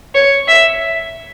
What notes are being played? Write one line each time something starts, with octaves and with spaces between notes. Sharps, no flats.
C#5
E5